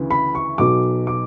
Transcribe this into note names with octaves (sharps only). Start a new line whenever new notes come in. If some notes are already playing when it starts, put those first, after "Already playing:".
Already playing: D2 C#3 E3
B5
C#6
B1 B2 F#3 D6
D6